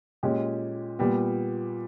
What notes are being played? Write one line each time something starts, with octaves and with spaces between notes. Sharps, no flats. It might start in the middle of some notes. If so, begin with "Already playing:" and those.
A#2 G#3 C#4 G4
A#2 G3 B3